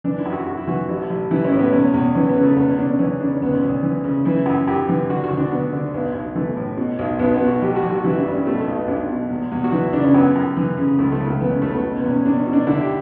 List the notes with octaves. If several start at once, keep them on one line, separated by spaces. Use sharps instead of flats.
E3 D4
E4
F#2
F#4
F#2 F#4
E4
E3 F#4
A1 E4
A1
E3 E4
C#4
A2
B3
E2 C#4
E2
E3 C#4
B3
C#3
A3
E2 B3
C#4
E2 D4
C#4
E3 C#4
C#3 D4
C#4
D2 B3
C#4
D2
E3
C#3
E3 E4
F#2
F#2 G4
E3
D3 F#4
F#4
D2
D4
D2 B3
D3
B1 B3
B1
E3 A3
A2
B2
B1
B1 B3
B3
B2
F#4
A1 G4
F#4
A1
F#4
E3 E4
D4
G2
C#4
B2 A3
A3
B1
B3
B1 D4
B2
E2
E2
F#4
E3 E4
C#3 D4
C#4
F#2 B3
F#2
E3
C#3
C#2 A3
A3
C#2
A3
E3 B3
C#4
C#3 A3
B3
B2
B3
E2
C#4
E2 D4
C#4
B2
D4
D3 E4
G4